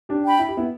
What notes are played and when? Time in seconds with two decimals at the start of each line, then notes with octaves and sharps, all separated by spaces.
0.09 D4 G4
0.24 G5 B5
0.39 E4
0.48 G4
0.57 B3 E4